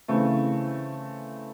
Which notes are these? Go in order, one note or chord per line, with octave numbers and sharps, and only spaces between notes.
C#3 E3 A3 C4